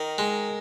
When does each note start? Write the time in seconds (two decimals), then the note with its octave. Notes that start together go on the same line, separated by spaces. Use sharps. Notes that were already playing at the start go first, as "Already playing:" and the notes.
Already playing: D#3 A#4
0.18 G#3